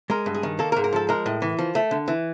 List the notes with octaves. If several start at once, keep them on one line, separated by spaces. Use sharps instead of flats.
G#3 A#4
G2
G#4
D#3
A#3 A4
A#4
G#2
A#4
F3 A4
G#3 A#4
A2
E3
F3
A3
D3
E3